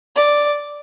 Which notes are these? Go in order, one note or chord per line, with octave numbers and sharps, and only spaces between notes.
D5